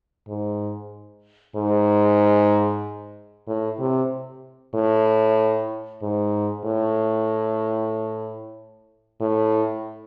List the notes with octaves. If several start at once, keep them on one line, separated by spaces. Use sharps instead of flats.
G#2
G#2
A2
C3
A2
G#2
A2
A2